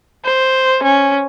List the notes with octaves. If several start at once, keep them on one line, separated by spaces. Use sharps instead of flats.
C5
C#4